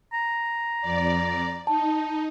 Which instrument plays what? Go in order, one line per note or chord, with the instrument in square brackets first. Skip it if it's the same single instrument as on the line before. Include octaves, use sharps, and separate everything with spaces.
[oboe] A#5
[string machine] F2 D5
[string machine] D#4 [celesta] A5